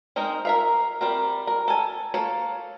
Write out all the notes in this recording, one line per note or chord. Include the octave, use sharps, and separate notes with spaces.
G#3 C4 D#4 A#4
A#4 E5 F5
G3 C4 A#4
A#4
A4 G#5
A#3 A4 C#5